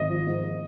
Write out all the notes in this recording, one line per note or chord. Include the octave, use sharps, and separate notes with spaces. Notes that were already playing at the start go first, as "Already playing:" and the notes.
Already playing: G#1 D#5
F3
G#2